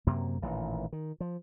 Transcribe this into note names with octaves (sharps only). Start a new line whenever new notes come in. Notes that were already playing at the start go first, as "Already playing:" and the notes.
F#2 C3 A#3
A1 A#2 D#3 E3
D#3
F3